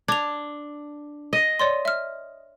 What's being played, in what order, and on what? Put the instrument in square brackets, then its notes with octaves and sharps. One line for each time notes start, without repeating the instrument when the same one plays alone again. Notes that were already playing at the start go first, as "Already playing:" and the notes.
[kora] D4 [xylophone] G#6 F7
[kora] D#5
[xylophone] C#5 D5 C6
E5 F6